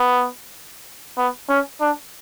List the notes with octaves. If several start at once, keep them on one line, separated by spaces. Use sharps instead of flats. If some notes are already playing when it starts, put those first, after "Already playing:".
Already playing: B3
B3
C#4
D4